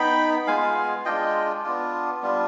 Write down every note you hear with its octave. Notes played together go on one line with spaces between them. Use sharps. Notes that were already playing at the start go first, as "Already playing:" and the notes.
Already playing: B3 D#4 G5 B5
G#3 B3 F4 F5 G#5
G#3 D4 F4 D#5 G5
B3 D4 F4
G3 B3 D4 F4